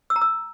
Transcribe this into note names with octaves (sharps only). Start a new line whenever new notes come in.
E6
A#5
E6